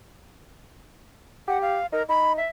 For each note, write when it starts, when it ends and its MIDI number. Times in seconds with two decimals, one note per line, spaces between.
1.48 1.79 67
1.48 1.58 78
1.62 1.86 77
1.92 2.02 63
1.92 2.03 70
2.09 2.39 63
2.09 2.32 83
2.37 2.46 76